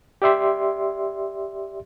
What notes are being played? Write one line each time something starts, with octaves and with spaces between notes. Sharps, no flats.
G4 D5 E5 C6